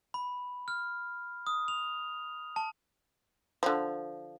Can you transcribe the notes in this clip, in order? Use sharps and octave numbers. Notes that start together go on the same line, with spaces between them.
B5
F6
D#6
F7
A5
D3 F3